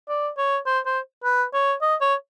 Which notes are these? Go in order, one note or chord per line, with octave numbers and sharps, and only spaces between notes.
D5
C#5
C5
C5
B4
C#5
D#5
C#5